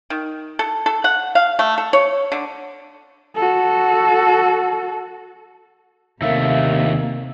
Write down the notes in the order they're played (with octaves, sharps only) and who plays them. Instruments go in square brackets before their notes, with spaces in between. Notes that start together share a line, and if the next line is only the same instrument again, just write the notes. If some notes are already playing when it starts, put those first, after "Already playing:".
[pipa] D#3
A4
A4
F#5
F5
A3
A4
C#5
D3
[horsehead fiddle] F#4 A4
[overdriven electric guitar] D#2 A3 [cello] C3 A#3 [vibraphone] A#4 F5 [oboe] E5